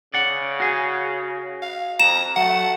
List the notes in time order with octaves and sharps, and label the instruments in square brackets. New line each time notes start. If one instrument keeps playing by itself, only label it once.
[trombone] C#3 [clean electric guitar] D5 F#5
[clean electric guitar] F#4 G#4
[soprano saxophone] F5
[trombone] F2 [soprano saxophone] A#5 [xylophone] E7
[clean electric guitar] F#3 [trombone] A3 [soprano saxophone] F#5